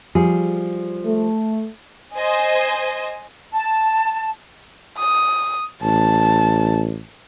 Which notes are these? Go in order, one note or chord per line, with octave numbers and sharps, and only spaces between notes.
F3 G3 G#4
A3
C5 D#5 G#5
A5
D#6
A1 A5